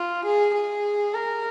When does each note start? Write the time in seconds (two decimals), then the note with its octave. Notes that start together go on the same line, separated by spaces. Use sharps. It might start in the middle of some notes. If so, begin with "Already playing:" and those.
Already playing: F4
0.25 G#4
0.55 G#4
1.14 A#4